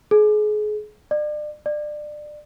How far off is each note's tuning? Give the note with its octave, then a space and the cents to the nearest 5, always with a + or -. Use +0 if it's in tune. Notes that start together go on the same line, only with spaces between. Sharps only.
G#4 +30
D5 +35
D5 +25